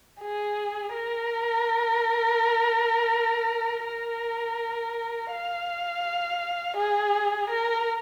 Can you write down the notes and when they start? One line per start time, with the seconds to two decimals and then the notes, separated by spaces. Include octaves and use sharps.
0.21 G#4
0.93 A#4
3.85 A#4
5.31 F5
6.76 G#4
7.50 A#4